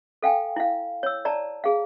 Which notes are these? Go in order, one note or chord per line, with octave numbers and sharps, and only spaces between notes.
A4 F5 G5 G#5
E4 F5
C#5 E6
D5 A5 A#5
G#4 F5